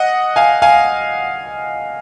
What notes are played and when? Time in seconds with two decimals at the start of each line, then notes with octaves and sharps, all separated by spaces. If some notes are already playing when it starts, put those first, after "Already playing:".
Already playing: D#5 F#5
0.36 F5 G#5
0.62 F5 G#5